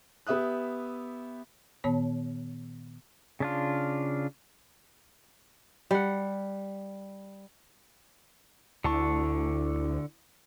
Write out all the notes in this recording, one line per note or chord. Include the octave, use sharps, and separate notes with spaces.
B3 G4 E5 D#6 F#6
A#2 D#3 B3 C#5 A5
C#3 D4 F4
G3 F#5
D2 D3 E4 A5 C#6